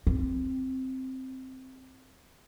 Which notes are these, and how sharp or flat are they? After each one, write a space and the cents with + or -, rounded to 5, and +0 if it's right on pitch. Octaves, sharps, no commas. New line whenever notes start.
C4 +0